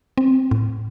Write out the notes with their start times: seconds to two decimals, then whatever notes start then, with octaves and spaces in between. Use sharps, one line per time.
0.18 C4
0.51 A2